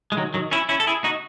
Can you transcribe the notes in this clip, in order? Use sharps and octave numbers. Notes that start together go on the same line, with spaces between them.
G#3
D#3 F#3
D#3 F#3
C#4 E4
C#4 E4
A4
E4 G#4
D#4 F#4